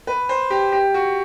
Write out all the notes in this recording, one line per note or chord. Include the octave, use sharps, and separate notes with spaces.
B4
C5
G4
G4
F#4